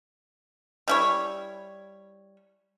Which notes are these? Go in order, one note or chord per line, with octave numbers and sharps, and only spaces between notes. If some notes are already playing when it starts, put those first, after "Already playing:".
G3 E4 C#5